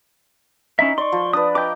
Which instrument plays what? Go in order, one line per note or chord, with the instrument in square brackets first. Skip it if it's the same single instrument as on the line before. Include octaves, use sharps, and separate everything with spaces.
[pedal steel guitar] C#4 E4 E5 [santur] D#4
[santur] D5 [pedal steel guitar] C6 C#6
[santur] F3
[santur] D4 B4 [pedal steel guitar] D#6
[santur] D#5 G5 A#5 [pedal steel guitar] D6 G6